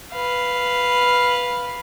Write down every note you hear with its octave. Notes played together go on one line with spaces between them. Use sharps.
B4 F5